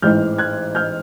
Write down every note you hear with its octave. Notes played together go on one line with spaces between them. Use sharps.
A1 G#2 E3 F6 G6
F#6 G#6
F6 G6